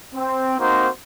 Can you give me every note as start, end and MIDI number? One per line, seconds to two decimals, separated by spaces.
0.14 0.55 60
0.59 0.87 58
0.59 0.87 60
0.59 0.87 63
0.59 0.87 66
0.59 0.87 72